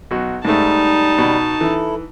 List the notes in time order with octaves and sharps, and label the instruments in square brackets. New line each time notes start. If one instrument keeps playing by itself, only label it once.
[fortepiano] B1 F#4
[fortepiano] G#2 A3 [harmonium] G3 [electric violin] D#4 A5
[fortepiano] B2
[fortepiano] E3 [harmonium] E4 A4